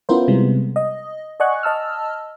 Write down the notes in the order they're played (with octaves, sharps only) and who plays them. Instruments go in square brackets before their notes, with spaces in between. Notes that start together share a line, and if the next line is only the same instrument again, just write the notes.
[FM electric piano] B3 C#4 E4 F4 A#4 C5
C3 G3 G#3 B3
D#5
D5 D#5 F#5 G#5 C#6 F#6
D#5 A5 E6 F6